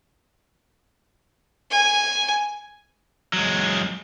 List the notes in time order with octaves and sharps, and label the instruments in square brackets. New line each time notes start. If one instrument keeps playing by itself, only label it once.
[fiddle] G#5
[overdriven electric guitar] F#3 G#3